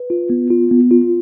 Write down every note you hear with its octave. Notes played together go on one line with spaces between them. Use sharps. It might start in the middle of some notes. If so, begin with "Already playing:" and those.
Already playing: B4
F4
B3
F4
B3
F4